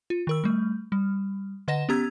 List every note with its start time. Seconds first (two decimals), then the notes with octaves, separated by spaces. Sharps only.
0.10 F4
0.27 D#3 A#4 E6
0.44 G3 A3
0.92 G3
1.68 D3 B4 D#5 F#5 A#6 E7
1.89 B3 C#4 G4 A#5 E6 G#6